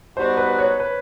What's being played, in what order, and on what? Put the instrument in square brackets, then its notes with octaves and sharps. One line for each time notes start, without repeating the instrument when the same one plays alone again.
[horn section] G3 B3 D#4 F#4 [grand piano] C5
[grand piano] B4
C#5
B4